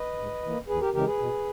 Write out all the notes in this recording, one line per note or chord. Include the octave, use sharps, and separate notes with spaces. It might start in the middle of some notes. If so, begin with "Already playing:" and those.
Already playing: B4 D#5
G#2
E3 A#3
E2 G#4 B4
G4 A#4
C#3 E3 G#3 G4 A#4
G#4 B4
B2